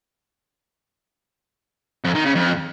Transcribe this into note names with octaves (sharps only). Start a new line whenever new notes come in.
F2
D#3
C#3
F2